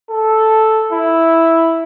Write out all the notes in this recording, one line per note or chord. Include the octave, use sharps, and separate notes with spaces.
A4
E4